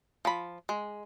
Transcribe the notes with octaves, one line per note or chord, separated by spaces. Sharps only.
F3 B5
G#3